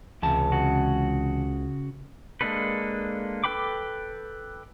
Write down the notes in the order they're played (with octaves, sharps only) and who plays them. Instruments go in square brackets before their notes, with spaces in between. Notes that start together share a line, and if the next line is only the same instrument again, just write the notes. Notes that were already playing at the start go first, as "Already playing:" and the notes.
[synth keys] C#2 [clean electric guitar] C3 E3 A5
[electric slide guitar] C#3 F#4
[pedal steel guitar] G#3 A#3 D4 A4 B4
A4 B4 G5 B5 D6